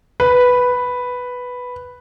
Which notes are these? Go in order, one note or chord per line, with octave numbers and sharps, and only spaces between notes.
B4